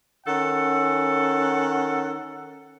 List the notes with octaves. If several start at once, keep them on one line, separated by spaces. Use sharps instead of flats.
D#3 C#4 A4 F#5